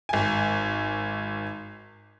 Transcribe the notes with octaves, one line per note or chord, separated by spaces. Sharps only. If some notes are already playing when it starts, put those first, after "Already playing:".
G#1 G#5